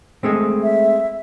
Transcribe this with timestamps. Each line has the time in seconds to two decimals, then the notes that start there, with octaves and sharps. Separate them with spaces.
0.23 G#3 A3 C4
0.63 E5